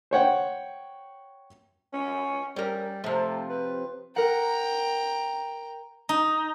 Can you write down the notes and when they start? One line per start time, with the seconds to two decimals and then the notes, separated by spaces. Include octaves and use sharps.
0.11 C5 C#5 F#5 G5
1.93 C#4
2.56 G3 C#4 A#4
3.04 C3 F3 A3
3.49 B4
4.16 A#4 F#5 G5 A#5
6.09 D#4